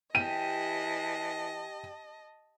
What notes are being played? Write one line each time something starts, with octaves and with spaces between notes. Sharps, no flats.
E3 G4 D#5 A5 D#7